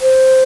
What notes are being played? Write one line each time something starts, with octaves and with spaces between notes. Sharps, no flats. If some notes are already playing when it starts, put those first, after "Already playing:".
C5